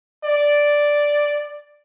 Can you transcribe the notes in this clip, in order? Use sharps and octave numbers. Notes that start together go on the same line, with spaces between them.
D5